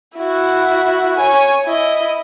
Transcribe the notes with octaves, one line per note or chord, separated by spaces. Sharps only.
E4 F#4
C#5 G#5
E4 D#5